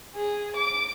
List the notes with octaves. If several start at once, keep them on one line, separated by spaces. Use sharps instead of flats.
G#4
D6